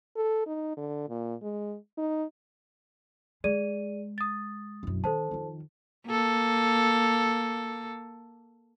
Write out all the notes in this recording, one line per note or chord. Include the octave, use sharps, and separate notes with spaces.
A4
D#4
D3
A#2
G#3
D#4
G#3 G#4 D5 D#7
D#6 A6
E1 F#2
D#3 A4 C5 A5
F2 D#3
A#3 A4